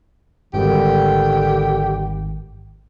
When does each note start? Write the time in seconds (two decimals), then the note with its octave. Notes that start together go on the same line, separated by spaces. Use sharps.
0.54 G#1 D3 D#3 G3 G4